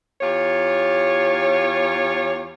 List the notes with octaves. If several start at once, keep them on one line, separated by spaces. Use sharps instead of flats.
E2 F4 G4 C#5